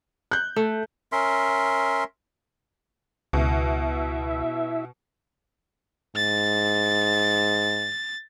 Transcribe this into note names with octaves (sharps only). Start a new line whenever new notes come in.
F#6 G6
A3
C#4 A#4 E5 C6
C#2 B2 E4 E5
G#2 A6